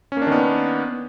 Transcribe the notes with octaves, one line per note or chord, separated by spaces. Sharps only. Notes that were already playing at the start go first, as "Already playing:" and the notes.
D#3 A#3 B3 C#4 D4